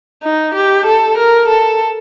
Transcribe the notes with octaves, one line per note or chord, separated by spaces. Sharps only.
D#4
G4
A4
A#4
A4